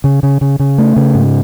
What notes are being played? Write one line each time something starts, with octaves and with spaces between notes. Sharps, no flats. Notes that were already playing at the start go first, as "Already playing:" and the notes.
C#3
C#3
C#3
C#3
A3
C#3
G#2